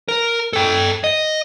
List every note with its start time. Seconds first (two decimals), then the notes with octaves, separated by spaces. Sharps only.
0.08 A#4
0.53 A4 G5
1.04 D#5